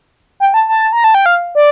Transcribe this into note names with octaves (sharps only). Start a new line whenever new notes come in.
G5
A5
A5
A#5
A5
G5
F5
D5